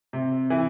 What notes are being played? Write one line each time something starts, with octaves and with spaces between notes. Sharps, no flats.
C3
E3